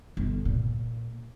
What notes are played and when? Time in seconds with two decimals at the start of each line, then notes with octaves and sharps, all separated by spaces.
0.17 G1
0.45 A#2